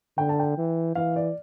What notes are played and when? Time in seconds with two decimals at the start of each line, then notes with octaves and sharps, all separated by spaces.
0.17 D3 G5
0.29 A5
0.39 G5
0.58 E3
0.95 E3 F5
1.16 D5